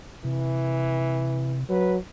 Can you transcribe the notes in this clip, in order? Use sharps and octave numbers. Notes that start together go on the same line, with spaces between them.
C3 E3
F#3 B4